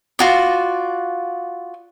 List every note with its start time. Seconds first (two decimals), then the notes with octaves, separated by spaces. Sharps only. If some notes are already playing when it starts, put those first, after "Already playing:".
0.19 F4 F#4 D5